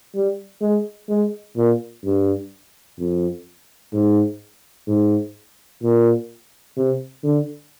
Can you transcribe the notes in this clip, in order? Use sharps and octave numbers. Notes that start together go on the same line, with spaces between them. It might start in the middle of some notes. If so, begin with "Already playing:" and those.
G3
G#3
G#3
A#2
G2
F2
G#2
G#2
A#2
C3
D3